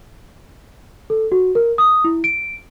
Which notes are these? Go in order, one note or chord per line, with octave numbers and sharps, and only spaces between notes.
A4
F#4
A#4
D#6
E4
D7